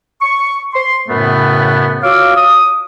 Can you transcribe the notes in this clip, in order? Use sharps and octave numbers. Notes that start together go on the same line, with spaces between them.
C#6
C6
F#2 A2 C#3 A3 B3
F4 F#4 C#5 F5 D6 E6
D#6